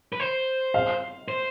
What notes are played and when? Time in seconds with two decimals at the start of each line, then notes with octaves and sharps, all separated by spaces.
0.13 B4
0.20 C5
0.74 F5
1.28 C5